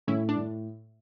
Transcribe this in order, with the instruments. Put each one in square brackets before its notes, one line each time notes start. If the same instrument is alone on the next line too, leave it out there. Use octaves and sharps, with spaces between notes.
[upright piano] A2 [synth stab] C#4 E4
[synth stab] D4
[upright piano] A2